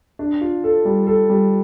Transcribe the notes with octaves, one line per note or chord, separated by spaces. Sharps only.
D4
F4
A4
G3
A4
G3